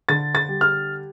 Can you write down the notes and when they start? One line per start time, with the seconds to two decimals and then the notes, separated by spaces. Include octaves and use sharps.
0.09 D3 A6
0.35 A6
0.49 G3
0.61 F6